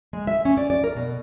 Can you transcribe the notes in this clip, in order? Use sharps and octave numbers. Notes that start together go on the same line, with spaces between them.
G#3
E5
C#4
D5
D5
A#4
B2